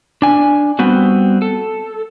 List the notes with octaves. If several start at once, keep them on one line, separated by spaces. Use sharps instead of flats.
D4 G#5
G3 B3 C4 F#4
A4